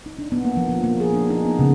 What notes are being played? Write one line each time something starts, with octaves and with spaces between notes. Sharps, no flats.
D#4
D4
B3
A#3
F3
F3
A#3
G#4
D4
D#4
B3
C#3